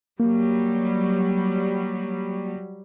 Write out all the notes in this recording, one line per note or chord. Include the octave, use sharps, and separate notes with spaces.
F#3 G3 A#3